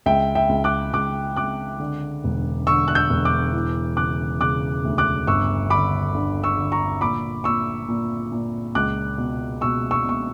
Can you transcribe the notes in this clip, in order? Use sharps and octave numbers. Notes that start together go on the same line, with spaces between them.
C#2 E5 G5
E5 G5
C#2
D6 F#6
C#2 D6 F#6
C#2 D6 F#6
D3
E1
D3 C#6 E6
F#6
E6 G6
E1
D6 F#6
E3
C#3 D6 F#6
C#3 D6 F#6
D2
D6 F#6
G1 C#6 E6
D3 B5 D6
D3
C#6 E6
D3
A#5 C#6
A#2 B5 D6
A#2 C#6 E6
A#2
A#2
C#2 D6 F#6
B2
B2 C#6 E6
C#6 E6
B2 C#6